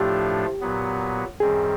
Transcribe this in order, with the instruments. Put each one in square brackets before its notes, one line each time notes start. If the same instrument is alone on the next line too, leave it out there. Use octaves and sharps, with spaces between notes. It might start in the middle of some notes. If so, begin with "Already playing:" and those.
Already playing: [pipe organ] A2 F3 A3 D4 F4 [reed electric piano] G4
[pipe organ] A#2 F#3 B3
[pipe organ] F#2 D#3 G3 C4 [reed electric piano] G#4